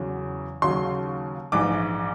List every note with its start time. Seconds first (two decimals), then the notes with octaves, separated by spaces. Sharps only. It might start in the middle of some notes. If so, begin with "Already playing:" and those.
Already playing: E2 C#3 F#3
0.62 D#2 C#3 F#3 C6
1.52 A#1 G#2 E3 D6